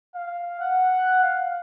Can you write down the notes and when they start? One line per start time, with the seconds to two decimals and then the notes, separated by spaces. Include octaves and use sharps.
0.15 F5
0.60 F#5
1.22 F5